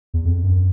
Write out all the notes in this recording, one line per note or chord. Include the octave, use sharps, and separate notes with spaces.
E2
F2
F#2